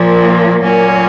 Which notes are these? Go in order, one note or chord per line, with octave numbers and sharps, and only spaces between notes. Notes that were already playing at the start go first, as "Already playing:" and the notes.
Already playing: A#2 F3 A#3
A#2 F#3 A#3 C#4